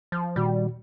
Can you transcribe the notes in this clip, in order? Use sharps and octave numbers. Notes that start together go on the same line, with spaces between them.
F3
A#2 D#3 G3 F#4